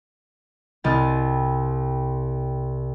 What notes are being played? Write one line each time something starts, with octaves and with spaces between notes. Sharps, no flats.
C2 D#5 F6 A6